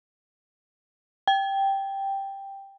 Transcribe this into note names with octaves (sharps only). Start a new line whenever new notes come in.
G5